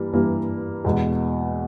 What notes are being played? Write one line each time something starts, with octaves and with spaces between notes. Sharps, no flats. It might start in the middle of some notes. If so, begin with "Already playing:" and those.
Already playing: G2 E3 G3 A#3
G2 E3 G3 A#3
E2 B2 G#3